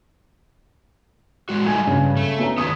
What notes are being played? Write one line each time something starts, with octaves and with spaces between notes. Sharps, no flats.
A2 G#3 F#4
G3 A3 D#4 G#5 G#6
G2 C#3
A3
B3 C#4 A#5
D#3 B3 D#6 G#6 B6